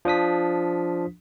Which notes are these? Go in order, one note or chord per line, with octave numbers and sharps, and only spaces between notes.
F3 D4 D#6 B6